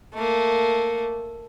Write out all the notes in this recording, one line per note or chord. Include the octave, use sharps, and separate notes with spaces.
A3 A#3